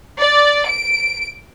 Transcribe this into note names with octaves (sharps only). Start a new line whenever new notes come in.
D5
D7